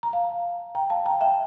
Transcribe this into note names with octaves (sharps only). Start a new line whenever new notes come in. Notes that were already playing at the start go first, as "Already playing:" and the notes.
A#5
F5 A5
G5 A#5
F5 A5
G5 A#5
E5 G5